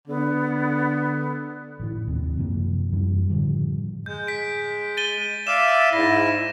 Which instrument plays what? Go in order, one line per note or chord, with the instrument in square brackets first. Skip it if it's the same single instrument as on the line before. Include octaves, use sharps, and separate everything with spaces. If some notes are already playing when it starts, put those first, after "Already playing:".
[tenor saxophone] D3 [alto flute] B3
[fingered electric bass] A1 E3
D#2 C3
F#2 C3 F3 A#3
F#2 E3 G3
A2 D3 F3 G3
[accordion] G#3 [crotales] G6
[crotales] B6 D7
A6 D#7 G7
[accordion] D5 E5 F5 [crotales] E7
[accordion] G#2 E4 [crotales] A#6